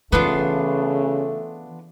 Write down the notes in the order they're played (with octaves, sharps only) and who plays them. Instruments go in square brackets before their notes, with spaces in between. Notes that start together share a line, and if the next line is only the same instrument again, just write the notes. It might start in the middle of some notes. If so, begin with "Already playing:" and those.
[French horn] C#3 [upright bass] E3 [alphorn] A3 [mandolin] B3 D4 F4